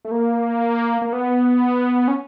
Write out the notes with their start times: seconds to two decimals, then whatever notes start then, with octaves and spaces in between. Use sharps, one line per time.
0.05 A3
0.11 A#3
1.02 A#3
1.13 B3
2.08 C#4